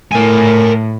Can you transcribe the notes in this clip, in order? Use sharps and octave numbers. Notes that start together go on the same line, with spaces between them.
A2 A#4 G#5